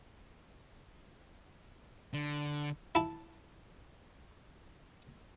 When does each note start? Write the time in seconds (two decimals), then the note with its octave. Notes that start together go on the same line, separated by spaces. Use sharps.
2.14 D3
2.95 E4 A5